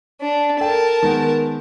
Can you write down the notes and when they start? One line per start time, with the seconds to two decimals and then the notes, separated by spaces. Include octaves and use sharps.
0.21 D4
0.60 A4 A#4 G5 A5
1.03 D#3 G#3 B3